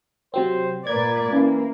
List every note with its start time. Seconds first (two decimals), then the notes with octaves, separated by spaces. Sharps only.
0.34 C3 F#3 C4 C5
0.87 A#2 A#3 B4 D5 G#6
1.32 E3 A#3 C#4 E4 F5